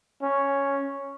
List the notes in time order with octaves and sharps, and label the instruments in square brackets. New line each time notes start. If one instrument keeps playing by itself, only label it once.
[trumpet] C#4